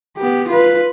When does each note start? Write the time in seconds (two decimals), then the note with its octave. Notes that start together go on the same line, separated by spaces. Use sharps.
0.18 B3 G4
0.48 F4 B4